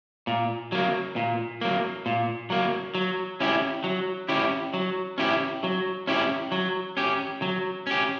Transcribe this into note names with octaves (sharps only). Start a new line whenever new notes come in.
A#2
F#3 A#3
A#2
F#3 A#3
A#2
F#3 A#3
F#3
C#4 E4 G4
F#3
C#4 E4 G4
F#3
C#4 E4 G4
F#3
C#4 E4 G4
F#3
C#4 G4
F#3
C#4 G4